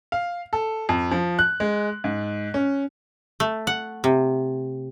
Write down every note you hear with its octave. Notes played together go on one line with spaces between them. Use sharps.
F5
A4
F2
F3
F#6
G#3
G#2
C#4
A3
F#5
C3